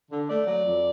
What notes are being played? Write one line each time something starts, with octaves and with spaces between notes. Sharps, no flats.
D3
A3 D5
F#3
F2